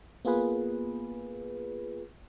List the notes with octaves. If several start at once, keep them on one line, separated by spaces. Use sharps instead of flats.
A#3 B3 F4 G#4 B4